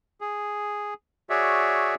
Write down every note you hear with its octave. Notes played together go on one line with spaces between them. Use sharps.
G#4
F#4 G#4 C#5 D5 E5